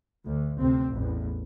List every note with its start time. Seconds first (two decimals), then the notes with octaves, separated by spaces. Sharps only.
0.24 D2
0.58 D2 C3 C4
0.91 A1 E2